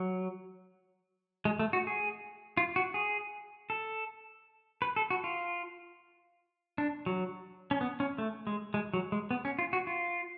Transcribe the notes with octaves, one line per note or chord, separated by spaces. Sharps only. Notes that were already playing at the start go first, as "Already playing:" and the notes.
Already playing: F#3
G#3
A3
F#4
G#4
F4
F#4
G#4
A4
B4
A4
F#4
F4
D4
F#3
C#4
B3
C#4
A3
G#3
G#3
F#3
G#3
B3
C#4
F4
F#4
F4